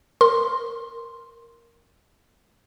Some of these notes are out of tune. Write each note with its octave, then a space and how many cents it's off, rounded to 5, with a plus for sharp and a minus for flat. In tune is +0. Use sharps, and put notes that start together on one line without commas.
A#4 +0 C6 +0